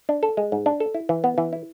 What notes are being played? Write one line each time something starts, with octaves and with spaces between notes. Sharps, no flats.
D4
A4
G#3
G#2
D4
A4
E4
E3
B3
E3
E4